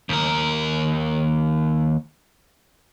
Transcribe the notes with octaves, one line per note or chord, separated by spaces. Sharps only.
D#2 A#4